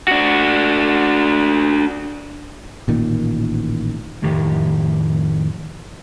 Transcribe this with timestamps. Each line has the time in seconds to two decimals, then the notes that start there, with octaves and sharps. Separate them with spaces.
0.08 D4 F#4
2.88 A1 A#2 D#3
4.22 F2 A2 D#3 G4